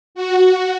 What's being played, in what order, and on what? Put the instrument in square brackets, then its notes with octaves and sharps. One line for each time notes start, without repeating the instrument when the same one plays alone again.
[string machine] F#4